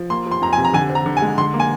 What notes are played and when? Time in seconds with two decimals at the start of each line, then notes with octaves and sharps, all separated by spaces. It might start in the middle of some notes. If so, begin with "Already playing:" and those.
Already playing: F3
0.10 A#3 C6
0.26 F3
0.31 C6
0.42 F2 A#5
0.53 G#5
0.57 C3
0.65 A#5
0.73 D3 G#5
0.90 C4
0.95 A#5
1.06 D3
1.17 G#5
1.22 G#3
1.38 D3 C6
1.54 A#3
1.60 G#5